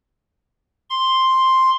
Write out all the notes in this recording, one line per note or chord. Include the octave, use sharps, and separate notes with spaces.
C6